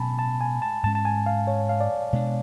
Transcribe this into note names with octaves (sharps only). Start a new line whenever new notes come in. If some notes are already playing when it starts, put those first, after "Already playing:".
Already playing: B2 F#3 C#4 G#5 A5 B5
A5
G#5
A5
G#2 G#3 C#4 A5
A5
G#5
F5
C#5
F5
D5
B2 G#3 B3 D4